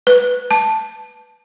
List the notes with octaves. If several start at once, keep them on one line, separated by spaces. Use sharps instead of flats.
B4
A5